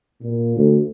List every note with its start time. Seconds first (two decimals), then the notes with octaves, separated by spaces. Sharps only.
0.20 A#2
0.57 D2